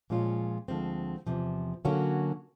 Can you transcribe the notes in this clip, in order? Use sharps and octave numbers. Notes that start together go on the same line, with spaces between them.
A#2 F3 G#3 C#4 F4
D2 D3 F3 G#3 C4
E2 C3 F3
D3 F#3 A#3 C#4 F#4